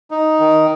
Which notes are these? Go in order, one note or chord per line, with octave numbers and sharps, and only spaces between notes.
D#4
D#3